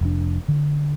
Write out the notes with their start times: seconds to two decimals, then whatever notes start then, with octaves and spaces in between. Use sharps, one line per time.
0.01 F1 D4
0.48 D3